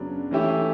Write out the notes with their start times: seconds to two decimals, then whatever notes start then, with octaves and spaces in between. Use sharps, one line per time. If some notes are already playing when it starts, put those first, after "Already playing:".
Already playing: F#2 C#3 F#3 B3 D4
0.31 E3 A3 C#4 E4 G4